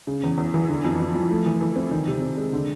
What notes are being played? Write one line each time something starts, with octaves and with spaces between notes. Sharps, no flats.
C#3
E2
E2
E3
D3
F2
F2
F3
A3
E3
E3
C4
D#3
C3
C3
G#3
D3